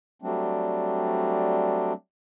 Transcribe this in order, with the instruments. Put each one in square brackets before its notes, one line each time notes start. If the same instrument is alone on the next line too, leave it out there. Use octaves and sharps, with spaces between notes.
[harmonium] F#3 G3 A3 C4 D4